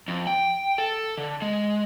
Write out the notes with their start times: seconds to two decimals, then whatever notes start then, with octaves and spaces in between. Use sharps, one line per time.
0.08 F2
0.27 G5
0.78 A4
1.18 D3
1.42 G#3